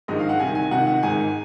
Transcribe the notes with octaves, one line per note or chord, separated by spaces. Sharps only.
A#1 G#2 D#3 D#5
F5
F#5
C2 C3 D#3 G#5
G#5
C#2 C3 D#3 F#5
F#5
G#1 G#2 D#3 G#5